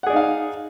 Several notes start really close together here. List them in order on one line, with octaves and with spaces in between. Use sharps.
F#5 G#4 D5 D#4 F5